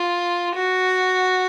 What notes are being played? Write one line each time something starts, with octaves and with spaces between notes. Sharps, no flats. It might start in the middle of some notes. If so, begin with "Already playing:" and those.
Already playing: F4
F#4